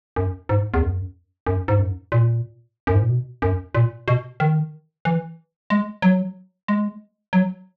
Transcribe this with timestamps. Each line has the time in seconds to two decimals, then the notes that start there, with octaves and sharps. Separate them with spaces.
0.16 F#2
0.49 G#2
0.74 E2
0.82 F#2
1.47 F#2
1.68 G#2
1.79 F#2
2.12 A#2
2.87 F#2
2.95 G#2
3.02 A#2
3.09 B2
3.42 F#2
3.75 A#2
4.08 B2
4.40 D#3
5.05 E3
5.70 G#3
6.02 F#3
6.68 G#3
7.33 F#3